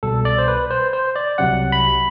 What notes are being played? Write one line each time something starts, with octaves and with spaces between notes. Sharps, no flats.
C2 B2 G3 A4
D5
C5
B4
C5
C5
D5
C2 C3 F#3 C4 F#5
B5